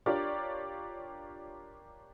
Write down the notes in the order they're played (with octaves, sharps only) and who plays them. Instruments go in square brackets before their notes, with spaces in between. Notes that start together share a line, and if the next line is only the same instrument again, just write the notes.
[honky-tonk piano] D4 F4 G4 A#4 C#5 D5